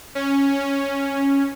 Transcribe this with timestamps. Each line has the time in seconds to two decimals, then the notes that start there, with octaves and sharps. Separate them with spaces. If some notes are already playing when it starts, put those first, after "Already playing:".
0.15 C#4